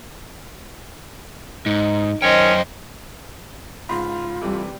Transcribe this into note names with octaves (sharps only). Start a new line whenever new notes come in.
G#2 D#4
F#2 D#3 C#4 C5 D#5 G5
G#2 C#3 F4 B5 C6
C3 E3 G3 A3